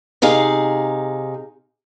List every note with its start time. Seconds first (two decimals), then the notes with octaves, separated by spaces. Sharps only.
0.22 C3 D#4 G#4 F5